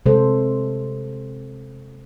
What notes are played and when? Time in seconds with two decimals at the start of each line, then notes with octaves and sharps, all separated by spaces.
0.06 C3 G#3 A4 C5